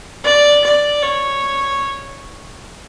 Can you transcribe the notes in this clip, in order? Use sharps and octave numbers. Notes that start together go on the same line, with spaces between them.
D5
D5
C#5